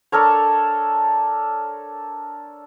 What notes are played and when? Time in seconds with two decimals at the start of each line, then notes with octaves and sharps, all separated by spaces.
0.12 D4 A4 A#4 C#5